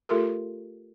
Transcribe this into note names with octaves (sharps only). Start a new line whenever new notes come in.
A3 F4 G4 A4 A#4